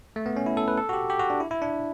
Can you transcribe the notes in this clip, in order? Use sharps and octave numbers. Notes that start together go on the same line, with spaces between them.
A3
B3
C#4
E4
A4
B4
A4
F#4
G4
G4
F#4
D4
E4
E4
D4